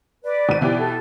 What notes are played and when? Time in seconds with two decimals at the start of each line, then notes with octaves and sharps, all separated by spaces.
0.25 B4 D5
0.49 G#1 D#7
0.61 B2 E3 G4 D5
0.80 A4